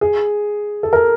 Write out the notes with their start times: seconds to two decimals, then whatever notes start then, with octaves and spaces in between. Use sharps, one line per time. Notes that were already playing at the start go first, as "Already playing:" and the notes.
0.01 G#4
0.83 A4
0.93 A#4